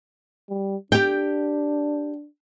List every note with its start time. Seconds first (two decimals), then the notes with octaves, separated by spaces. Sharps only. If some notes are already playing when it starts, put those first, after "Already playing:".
0.49 G3
0.92 D4 G4 G5